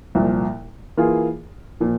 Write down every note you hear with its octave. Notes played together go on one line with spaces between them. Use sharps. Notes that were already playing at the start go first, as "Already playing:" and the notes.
C2 A#2 F3
E3 A#3 F4 G#4
A#2 F3